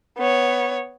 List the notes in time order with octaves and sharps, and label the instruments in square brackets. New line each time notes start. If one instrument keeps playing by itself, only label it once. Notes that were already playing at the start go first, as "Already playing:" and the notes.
[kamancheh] B3 C#5